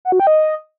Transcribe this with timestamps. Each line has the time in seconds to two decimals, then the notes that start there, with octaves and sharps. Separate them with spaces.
0.05 F#5
0.12 F#4
0.20 G5
0.27 D#5